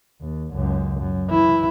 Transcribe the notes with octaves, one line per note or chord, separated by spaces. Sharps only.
D#2
C#2 F#2
F#2
E3 E4